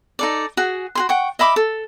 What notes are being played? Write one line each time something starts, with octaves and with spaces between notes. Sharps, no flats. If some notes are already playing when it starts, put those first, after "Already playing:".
D#4 A4 D5
F#4 G#4
F#4 G#4 C6
F#5 G5 C#6
D#5 E5 B5 D6
A4